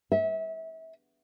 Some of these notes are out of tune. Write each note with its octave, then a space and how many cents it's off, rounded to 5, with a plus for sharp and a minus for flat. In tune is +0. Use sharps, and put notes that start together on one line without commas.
E5 -30